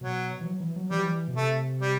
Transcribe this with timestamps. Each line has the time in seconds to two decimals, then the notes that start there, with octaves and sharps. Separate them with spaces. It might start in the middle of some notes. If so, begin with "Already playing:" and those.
0.01 B2 F#3
0.41 E3
0.45 F#3
0.60 E3
0.76 F#3
0.90 E3 G3
0.98 F#3
1.05 E3
1.28 B2
1.36 C3 A3
1.81 G3